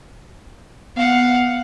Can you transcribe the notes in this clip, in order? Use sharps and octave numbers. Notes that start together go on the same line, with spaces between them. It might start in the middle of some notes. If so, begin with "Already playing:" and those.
B3 F5 F#5